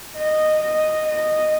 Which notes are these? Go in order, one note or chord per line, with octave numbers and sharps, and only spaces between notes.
D#5
D#5
D#5